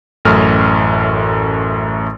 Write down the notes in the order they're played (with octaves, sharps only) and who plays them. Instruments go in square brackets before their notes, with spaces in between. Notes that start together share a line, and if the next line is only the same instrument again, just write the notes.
[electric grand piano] A1 F#2 A3 F6